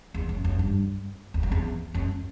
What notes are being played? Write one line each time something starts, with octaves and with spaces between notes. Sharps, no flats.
E2
F#2
F#2
G2
E2
F#2
E2
F#2